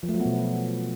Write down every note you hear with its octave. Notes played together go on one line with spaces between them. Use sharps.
F3
A3
F#3
B3
B2